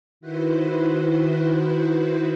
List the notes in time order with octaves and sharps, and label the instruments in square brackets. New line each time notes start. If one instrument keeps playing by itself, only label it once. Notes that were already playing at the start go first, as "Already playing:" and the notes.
[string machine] D#3 E4 F#4 B4 C5